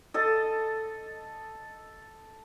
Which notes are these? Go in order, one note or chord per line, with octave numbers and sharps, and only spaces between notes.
A4 D#5 A5